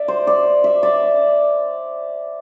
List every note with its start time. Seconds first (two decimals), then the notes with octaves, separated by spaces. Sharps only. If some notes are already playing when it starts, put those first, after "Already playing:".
Already playing: D5 E5
0.08 C5
0.27 D5
0.64 E5
0.83 D5